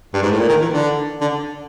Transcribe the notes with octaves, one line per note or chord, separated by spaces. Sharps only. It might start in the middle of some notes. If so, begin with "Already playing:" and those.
G2
G#2
A2
A#2
D#3
E3
D3
D3